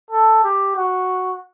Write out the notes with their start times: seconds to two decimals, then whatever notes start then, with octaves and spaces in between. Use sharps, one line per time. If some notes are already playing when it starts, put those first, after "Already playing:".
0.11 A4
0.44 G4
0.77 F#4